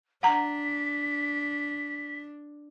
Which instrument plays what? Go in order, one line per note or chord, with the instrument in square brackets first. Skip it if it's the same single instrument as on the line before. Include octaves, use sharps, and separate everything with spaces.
[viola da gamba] D4 [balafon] F#5 A#5 [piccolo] B6